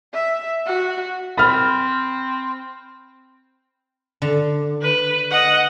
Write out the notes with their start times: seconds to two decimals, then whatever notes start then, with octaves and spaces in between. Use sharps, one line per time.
0.14 E5
0.66 F#4
1.38 C4 B5 F6
4.22 D3
4.82 B4
5.31 D#5 F#5